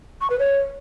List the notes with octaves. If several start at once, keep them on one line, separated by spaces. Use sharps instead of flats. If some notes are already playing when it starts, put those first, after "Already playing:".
C#6
B4
C#5